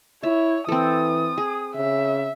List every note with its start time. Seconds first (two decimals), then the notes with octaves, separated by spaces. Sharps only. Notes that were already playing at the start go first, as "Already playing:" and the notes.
0.23 E4 C#5 E5
0.69 E3 C4 A4 D#6
1.38 G#4
1.75 C#3 E5